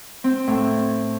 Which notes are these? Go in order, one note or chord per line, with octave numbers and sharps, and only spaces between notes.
C4
A2